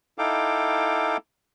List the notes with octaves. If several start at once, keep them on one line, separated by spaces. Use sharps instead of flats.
D#4 E4 A4 F5 G5 D6